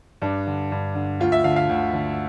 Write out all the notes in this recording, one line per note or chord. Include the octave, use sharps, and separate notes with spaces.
G2 D4
D3
G2
D3
D2 F4
E5
D3 F5
F5
D2
D3